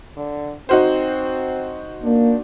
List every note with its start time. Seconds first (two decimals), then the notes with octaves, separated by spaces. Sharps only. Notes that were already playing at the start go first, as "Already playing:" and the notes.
0.17 D3
0.69 C4 D#4 F#4 C5
2.03 A#3 D4